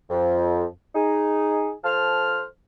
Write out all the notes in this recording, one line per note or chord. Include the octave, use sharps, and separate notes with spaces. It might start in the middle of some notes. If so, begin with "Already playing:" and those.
F2
D#4 G#4
F3 A4 C5 A5 F6